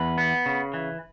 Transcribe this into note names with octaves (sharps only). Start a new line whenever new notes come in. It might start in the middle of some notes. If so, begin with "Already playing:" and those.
Already playing: E2 B4
B3
C#3
E3